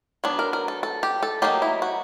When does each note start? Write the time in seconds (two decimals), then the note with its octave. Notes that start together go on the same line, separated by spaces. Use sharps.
0.24 F#3 B3 D4
0.39 A#4
0.53 A#4
0.68 A4
0.83 A4
1.03 G4
1.23 A4
1.42 F#3 A#3 D#4 G4
1.62 E4
1.82 F#4